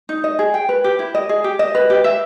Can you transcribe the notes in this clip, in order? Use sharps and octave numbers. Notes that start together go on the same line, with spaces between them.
D#4
D#5
G#4
G5
B4
G4
E4
D#5
G#4
G4
D#5
B4
G4
E5